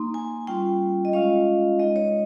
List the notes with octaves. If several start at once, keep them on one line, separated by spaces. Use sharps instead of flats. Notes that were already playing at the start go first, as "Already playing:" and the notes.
Already playing: A#3 D#4 C6
G#5
G3 C#4 F4 G5
D#5
G#3 C#4 F4 F5
G#3 D#4 D#5
C#5